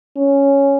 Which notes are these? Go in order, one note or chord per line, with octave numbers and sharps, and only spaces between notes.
C#4